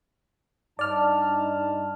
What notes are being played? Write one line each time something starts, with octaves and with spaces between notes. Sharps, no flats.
G2 D#4 D5 A5 F6